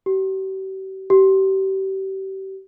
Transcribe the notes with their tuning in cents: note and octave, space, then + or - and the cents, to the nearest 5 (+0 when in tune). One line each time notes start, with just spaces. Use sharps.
G4 -45
G4 -30